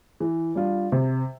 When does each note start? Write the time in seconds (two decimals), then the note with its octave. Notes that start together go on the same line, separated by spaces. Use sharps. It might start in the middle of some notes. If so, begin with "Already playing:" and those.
0.20 E3
0.55 G3 D4 F4
0.92 C3